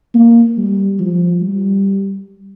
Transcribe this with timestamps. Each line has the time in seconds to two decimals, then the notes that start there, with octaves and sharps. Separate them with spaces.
0.14 A#3
0.58 G3
1.00 F3
1.42 G3